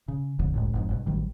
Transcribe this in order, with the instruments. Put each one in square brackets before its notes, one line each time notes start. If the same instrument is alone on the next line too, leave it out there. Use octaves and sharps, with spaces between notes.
[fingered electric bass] C#3
D#1 A#1 F2 D3
F#1 C#2 A2
G1 F2 G#2
G1 G2 B2
A1 D#3 F#3 G3